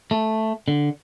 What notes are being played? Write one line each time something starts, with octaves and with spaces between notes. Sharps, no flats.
A3
D3